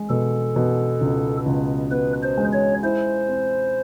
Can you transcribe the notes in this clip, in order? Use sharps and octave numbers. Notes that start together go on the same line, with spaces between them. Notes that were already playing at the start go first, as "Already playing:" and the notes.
Already playing: G#3
B2 A4
B2
C#2
C#2
B3 B4
C5
G#3
C#5
E4 C5
C4